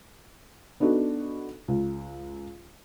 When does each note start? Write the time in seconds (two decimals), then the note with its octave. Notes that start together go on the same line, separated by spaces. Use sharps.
0.80 B3 D4 D#4 F#4 A4
1.68 C#2